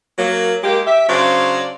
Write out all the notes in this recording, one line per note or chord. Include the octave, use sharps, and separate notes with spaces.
F#3 A#3
G#3 A#3 G4
G4 E5
C#3 F#3 D4 C5 D5 F5